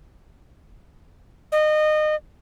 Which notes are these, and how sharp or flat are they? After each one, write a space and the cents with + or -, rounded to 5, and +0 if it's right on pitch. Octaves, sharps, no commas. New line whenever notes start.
D#5 -25